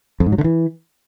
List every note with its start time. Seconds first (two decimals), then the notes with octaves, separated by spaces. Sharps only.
0.20 F2
0.26 G#2
0.32 F#3
0.38 D3
0.44 E3